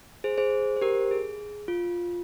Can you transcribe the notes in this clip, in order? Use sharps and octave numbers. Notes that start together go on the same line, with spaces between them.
G#4 C5
G#4 C5
C5
G4 A#4
G#4
F4